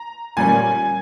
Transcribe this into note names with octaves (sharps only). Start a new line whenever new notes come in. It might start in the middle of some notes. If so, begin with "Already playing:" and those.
Already playing: A#5
A#2 G3 A#3 C#4 G#5